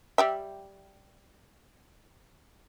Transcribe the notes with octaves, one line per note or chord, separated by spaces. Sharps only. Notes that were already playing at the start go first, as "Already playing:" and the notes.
G3 G4 E5